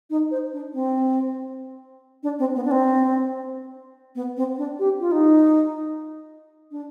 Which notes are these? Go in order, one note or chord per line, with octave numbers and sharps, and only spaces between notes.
D#4
C5
D4
C4
D4
C4
B3
D4
C4
B3
C4
D4
G4
F4
D#4
D4